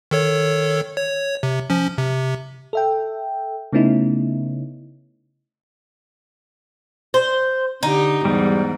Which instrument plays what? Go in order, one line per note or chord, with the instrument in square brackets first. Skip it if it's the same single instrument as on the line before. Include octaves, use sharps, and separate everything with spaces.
[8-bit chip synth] D#3 A4 C#5
C#5
C3
F3 C#4
C3
[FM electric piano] A4 E5 G5
C#3 A3 B3 C#4 D#4 E4
[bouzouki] C5
[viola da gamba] D3 G4 [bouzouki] D#4
[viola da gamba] E2 G#2 [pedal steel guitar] G3